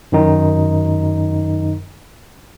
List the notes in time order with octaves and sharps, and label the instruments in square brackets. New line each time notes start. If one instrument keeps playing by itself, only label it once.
[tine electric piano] F#2 D#3 D#4